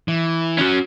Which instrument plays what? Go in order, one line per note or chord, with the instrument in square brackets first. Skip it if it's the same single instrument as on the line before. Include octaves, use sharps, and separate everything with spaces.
[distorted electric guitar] E3
[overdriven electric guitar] F#3 C#4